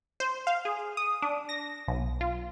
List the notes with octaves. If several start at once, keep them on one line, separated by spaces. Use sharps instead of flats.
C5
F5
G#4
D#6
D4
A#6
B1
F4